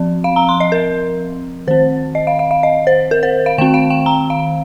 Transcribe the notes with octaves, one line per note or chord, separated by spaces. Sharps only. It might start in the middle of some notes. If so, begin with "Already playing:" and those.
Already playing: F3 C4
F5
A#5
C6
D#5
A#4
D#3 C4 C5
D#5
F5
F5
F5
D#5
C5
A#4
C5
F5
D#3 C4 G5
F5
G5
A#5
F5